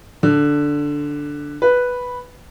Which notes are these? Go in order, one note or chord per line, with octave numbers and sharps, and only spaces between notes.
D3
B4